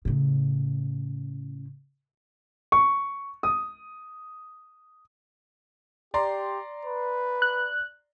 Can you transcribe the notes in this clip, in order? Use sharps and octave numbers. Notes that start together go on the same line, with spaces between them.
A2 C#3
C#6
D#6
G4 D5 A#5 C6
B4
F#6